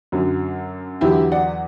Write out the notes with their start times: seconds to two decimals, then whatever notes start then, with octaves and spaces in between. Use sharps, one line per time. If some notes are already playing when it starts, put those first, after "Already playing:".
0.12 F#2 D3 F#3
1.01 E2 D3 F#3 E4 G4
1.32 D5 F#5